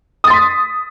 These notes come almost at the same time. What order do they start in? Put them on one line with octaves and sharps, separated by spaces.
D#6 A6 C6 B6